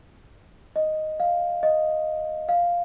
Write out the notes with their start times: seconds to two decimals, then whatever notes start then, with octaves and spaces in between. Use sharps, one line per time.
0.76 D#5
1.20 F5
1.63 D#5
2.49 F5